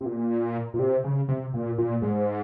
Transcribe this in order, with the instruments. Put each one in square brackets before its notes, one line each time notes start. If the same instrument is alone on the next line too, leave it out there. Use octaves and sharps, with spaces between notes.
[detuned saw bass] C3
A#2
A#2
C3
C#3
C3
A#2
A#2
G#2